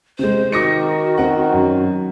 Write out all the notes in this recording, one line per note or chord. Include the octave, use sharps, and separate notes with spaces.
C3 G#3 C5
D#3 F#4 D6 A#6 C#7
C4 F#5
F#2